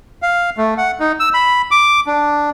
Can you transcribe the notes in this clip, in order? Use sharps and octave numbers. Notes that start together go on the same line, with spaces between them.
F5
A3
F#5
D#4
E6
B5
D6
D4